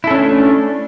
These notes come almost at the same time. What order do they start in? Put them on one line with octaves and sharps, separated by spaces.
E4 A4 C#4 D4 A3